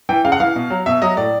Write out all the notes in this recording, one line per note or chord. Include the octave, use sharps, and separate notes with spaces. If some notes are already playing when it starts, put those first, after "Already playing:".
E3 G5
C#3 F5
F#5
E3 F5
B2
F#3
B2 E5
F#3 D#5
A2 D5